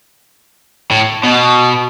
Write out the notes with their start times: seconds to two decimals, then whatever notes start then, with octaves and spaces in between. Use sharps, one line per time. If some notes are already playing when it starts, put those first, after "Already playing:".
0.91 A2
1.24 B2